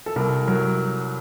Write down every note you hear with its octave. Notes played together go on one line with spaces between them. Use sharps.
A4
C2 A#4
F#3 A#4